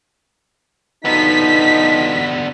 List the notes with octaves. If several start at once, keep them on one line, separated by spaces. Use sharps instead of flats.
B2 D3 F3 B3 D#4 B6